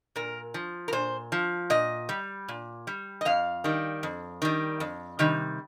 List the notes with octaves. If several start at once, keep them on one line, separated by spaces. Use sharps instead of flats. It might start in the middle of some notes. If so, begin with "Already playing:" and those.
A#2 A#4
F3
A#4
A#2 C5
F3
A#2 D#5
G3
A#2
G3
D#5
F2 F5
D#3 G3
F2
D#3 G3
F2
C3 D#3 G3